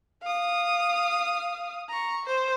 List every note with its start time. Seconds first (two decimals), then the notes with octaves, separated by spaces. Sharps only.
0.22 F5 D#6
1.89 A#5 C#6
2.26 C5